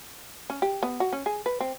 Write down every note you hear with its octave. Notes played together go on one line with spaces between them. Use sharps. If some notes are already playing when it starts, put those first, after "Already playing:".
C#4
G4
B3
F#4
C#4
G#4
B4
C4